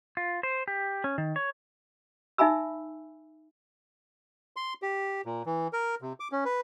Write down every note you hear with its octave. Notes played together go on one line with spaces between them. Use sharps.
F4
C5
G4
C#4
D#3
C#5
D#4 E5 G#5 B5 E6
C6
G4
A#2
E3
A#4
C3
D6
C#4
B4